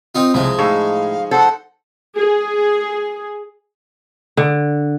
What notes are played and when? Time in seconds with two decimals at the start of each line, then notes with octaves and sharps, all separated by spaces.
0.15 C4 D#4 F4
0.34 C2 C#3 F3 G#3
0.59 A2 D#4 G#4 F5 C#6
1.31 A4 C5 F#5
2.18 G#4
4.37 D3